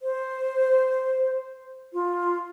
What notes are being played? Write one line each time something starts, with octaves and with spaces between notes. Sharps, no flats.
C5
F4